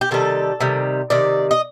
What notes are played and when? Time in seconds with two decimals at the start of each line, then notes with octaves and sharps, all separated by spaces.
0.01 G4
0.11 C3 D#3 G3 A4
0.61 C3 D#3 G3
1.10 C3 D#3 D5
1.51 D#5